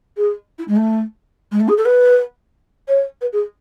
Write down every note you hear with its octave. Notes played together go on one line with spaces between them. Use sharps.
G#4
E4
G#3
A3
G#3
A3
G#4
A4
B4
C#5
B4
G#4